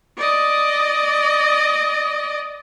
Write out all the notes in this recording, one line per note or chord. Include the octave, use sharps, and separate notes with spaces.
D5 D#5